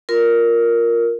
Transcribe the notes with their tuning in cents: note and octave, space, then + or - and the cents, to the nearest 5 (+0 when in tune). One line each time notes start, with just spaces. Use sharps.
F4 +5 A#4 +0